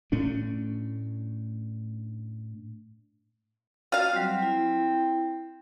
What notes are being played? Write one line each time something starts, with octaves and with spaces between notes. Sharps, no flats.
A2 A3 C#4 D4
F4 F#4 D#5 F5
F#3 G3 C4
E4